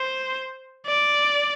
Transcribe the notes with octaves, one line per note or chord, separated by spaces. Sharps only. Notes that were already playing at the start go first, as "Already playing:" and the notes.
Already playing: C5
D5